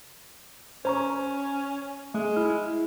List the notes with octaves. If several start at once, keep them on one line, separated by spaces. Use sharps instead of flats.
C#4 C5 A#5 C#6
G#3 A3
E4 F6